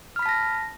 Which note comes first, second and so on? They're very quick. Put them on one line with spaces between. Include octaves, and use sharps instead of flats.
F6 B5 B6 A5 A#6